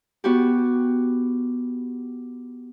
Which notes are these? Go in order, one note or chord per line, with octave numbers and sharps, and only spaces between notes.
B3 F#4 G4